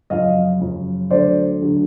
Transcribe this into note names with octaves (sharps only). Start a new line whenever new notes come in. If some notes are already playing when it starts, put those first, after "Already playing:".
F#2 C#3 F3 D#5 F5
F#2 C#3 F3
D2 D3 F#3 A3 C5 D5
D2 D3 F#3 A3